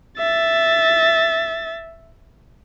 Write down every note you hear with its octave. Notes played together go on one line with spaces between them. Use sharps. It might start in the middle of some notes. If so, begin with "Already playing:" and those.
E5 A6